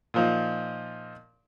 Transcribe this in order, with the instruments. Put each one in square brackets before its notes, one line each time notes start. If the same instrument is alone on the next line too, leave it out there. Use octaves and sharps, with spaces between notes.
[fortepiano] A#2 F3 D#4